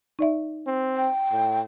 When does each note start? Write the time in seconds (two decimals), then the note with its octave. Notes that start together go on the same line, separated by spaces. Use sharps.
0.19 D#4 D5 E5
0.67 C4
0.97 G5
1.32 A2